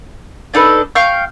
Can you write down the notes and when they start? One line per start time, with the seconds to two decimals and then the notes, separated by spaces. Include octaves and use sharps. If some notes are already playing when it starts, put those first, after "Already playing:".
0.54 D4 D#4 A4 B4
0.95 F5 G5 C#6 F6